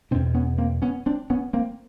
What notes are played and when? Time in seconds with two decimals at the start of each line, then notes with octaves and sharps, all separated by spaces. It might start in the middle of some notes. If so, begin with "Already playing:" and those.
0.11 E2 B2 C4 D4
0.34 B3 C#4
0.58 A#3 C4
0.82 B3 C#4
1.06 C4 D4
1.30 B3 C#4
1.53 A#3 C4